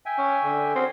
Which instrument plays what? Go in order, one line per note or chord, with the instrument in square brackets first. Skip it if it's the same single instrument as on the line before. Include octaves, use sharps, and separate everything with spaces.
[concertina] E5 G5 G#5
[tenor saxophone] C#4
D3
[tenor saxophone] C4 [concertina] C#4 F#4 G#4